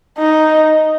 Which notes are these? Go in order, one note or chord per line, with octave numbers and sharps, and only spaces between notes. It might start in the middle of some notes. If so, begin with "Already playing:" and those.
D#4